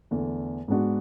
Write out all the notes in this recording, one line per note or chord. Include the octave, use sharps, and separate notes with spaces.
E2 D3 A3
G#2 G#3 B3 D4 F#4